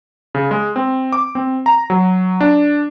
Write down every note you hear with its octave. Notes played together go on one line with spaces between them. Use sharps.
C#3
G#3
C4
D6
C4
A#5
F#3
D4